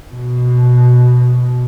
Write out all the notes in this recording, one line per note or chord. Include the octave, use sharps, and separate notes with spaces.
B2